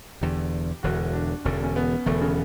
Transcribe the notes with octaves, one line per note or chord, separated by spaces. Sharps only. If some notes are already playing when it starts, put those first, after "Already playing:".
E1 E2 D3 G4
E1 E2 D3 F#4
D4
E1 E2 D3 C#4
C#4
B3
E1 E2 D3 A3
C#3